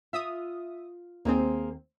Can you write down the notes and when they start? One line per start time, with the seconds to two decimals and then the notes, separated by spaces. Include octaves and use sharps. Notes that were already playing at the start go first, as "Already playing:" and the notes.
0.13 F4 E5 D#6
1.25 D#2 A#3 C4 G#4 C5